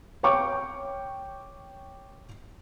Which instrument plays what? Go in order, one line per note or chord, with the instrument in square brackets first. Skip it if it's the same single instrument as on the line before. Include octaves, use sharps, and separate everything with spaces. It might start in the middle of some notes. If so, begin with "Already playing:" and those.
[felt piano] C#5 G5 C#6 D6